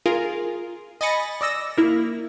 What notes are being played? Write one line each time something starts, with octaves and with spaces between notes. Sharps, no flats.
F4 G#4 A#4
D#5 G#5 B5 A6 A#6 C#7
D5 D#5 E6 A#6
A#3 E4